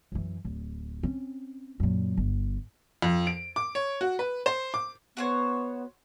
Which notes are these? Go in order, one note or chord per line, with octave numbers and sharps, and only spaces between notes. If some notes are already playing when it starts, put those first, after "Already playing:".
F#2 E3
D1
C4 C#4
F#2 A#2
G1
F2
D7
D6
C#5
F#4
B4
C5
D6
B3 F#4 C5 C#5